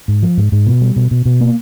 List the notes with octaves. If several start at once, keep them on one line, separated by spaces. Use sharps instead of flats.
G#2
F3
G#2
G#2
B2
G3
B2
B2
B2
A#3